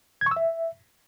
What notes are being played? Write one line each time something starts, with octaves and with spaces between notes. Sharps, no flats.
G#6
C#6
E6
E5